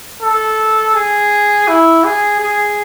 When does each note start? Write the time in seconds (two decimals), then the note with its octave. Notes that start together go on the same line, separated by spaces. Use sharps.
0.22 A4
0.95 G#4
1.67 E4
2.04 G#4
2.40 G#4